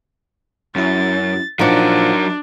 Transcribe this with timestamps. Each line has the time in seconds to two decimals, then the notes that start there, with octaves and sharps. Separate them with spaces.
0.76 F#2 C#4 E4 A6
1.59 A#2 F3 F#3 D4 D#4 A#4 F#5 C#7